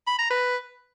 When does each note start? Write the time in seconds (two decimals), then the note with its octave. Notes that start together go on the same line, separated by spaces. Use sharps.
0.07 B5
0.19 A#5
0.30 B4